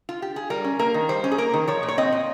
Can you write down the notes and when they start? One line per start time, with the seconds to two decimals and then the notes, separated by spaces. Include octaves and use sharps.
0.09 F4
0.22 G4
0.36 G#4
0.50 G3 A#4
0.64 C#4
0.79 A#3 A#4
0.94 D#3
1.09 G3 C5
1.24 C#4
1.31 G#4
1.38 A#3 A#4
1.53 D#3
1.67 F3 C#5
1.83 A#2
1.88 C#5
1.98 C4 D#5
2.12 A#2